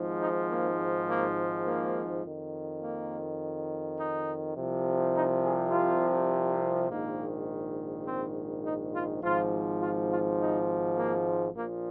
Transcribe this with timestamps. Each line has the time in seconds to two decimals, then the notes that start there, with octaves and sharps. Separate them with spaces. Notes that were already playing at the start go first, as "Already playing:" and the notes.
Already playing: G#1 G#2 F3
0.19 D#4
0.48 A#3
1.07 A#3
1.65 A#3
2.23 F2 D#3
2.81 A#3
3.97 D#4
4.56 C2 C3 F3
5.14 D#4
5.43 G#4
5.72 F4
6.88 A#1 G#2 D#3 A#3
8.04 C4
8.63 D#4
8.92 F4
9.21 G#1 G#2 F3 F4
9.79 F4
10.09 F4
10.38 D#4
10.95 A#3
11.54 A#1 A#2 F3 A#3